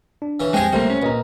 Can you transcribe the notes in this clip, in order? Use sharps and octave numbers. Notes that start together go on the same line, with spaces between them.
D4
C#3 E3
F2 G#3 C4 G4 G#4 D#5 G5
C#2 C3 G3 A3 A#3 C5
C#4
A#1 B4 D#5 A#5